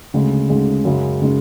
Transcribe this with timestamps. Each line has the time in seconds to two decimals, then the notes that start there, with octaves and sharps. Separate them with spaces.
0.14 D2 C#3 G#3
0.49 D2 C#3 G#3
0.85 F#2 C#3 G#3 C#4
1.22 C#3 G#3 C#4